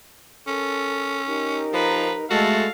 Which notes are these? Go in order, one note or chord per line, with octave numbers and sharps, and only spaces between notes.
C#4 A4 A#4
D#4 G4 A#4
F3 B4 A#5
G#3 A3 F#4 A4 D#5 F5